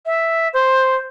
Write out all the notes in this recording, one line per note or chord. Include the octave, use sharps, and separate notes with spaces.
E5
C5